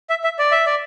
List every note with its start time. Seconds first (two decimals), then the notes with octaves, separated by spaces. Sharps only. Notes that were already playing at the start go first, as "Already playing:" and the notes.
0.10 E5
0.24 E5
0.39 D5
0.52 E5
0.66 D5